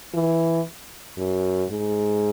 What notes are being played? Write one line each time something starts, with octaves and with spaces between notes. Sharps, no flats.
E3
F#2
G#2